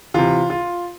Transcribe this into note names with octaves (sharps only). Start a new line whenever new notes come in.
C3 E3 F4
F4